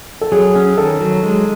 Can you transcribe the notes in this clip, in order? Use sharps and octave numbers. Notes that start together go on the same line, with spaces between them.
A4
F#3 G#4
C#4
D#3 A4
F#3
G#3